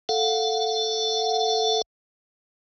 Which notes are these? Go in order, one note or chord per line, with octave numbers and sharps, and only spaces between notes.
A4 F5 F#5